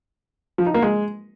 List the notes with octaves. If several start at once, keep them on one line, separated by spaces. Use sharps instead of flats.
F3
D#4
A#3
G#3